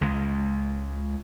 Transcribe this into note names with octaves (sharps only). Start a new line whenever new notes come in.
C#2 C#3 G#3